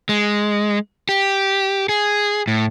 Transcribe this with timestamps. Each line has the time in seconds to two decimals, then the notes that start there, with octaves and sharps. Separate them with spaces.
0.09 G#3
1.09 G4
1.89 G#4
2.48 A2